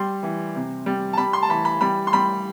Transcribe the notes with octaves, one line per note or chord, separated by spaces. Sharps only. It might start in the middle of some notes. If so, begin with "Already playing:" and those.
Already playing: G3 C6
E3
C3
G3
A5
G3 B5
C6
A5
E3 B5
B5
G3 B5
C6
G3 B5